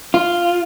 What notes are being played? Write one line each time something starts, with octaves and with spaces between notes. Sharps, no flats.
F4